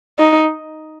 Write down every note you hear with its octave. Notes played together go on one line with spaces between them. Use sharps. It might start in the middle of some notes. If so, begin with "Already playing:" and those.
D#4